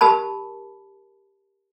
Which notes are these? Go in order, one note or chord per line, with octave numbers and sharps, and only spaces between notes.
G4 A#4 A5 B5